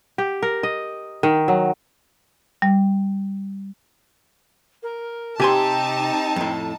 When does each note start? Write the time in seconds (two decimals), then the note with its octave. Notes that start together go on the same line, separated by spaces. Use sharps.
0.18 G4
0.43 A#4
0.63 D#5
1.23 D#3
1.48 F#3
2.62 G3
4.83 A#4
5.40 C3 C4 D#4 G4 G#5 A5 C6
6.36 F2 A2